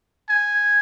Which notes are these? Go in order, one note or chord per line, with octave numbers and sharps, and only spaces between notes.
G#5